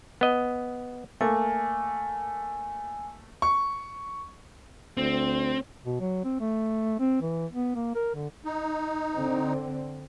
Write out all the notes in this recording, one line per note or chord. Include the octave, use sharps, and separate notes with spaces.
B3 D#5
A3 A#3 G#5
C#6
D2 C4
B2
F#3
C4
A3
C4
E3
B3
A#3
A#4
D3
D#4
D3 C4